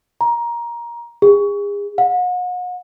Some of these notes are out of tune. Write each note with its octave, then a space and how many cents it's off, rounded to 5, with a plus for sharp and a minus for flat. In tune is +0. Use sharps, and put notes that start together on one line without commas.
A#5 +15
G#4 -35
F#5 -40